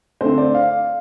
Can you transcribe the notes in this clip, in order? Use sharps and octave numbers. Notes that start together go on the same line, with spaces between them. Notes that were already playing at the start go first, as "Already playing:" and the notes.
D3 A3 C4 C5
D5
F5